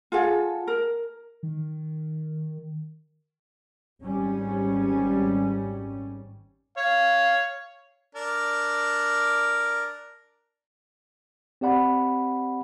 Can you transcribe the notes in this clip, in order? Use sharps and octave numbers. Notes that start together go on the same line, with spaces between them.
F4 G#4 A4 F#5
A#4
D#3
G#1 G3 C#4
C#5 F5
D4 A#4
C4 G4 D5 F#5 B5